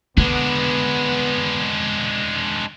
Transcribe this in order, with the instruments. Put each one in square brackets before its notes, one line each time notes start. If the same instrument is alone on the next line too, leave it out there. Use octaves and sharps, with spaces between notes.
[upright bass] D3 [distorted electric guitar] G#3 D4 [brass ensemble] B3